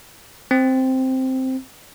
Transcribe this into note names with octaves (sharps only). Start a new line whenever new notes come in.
C4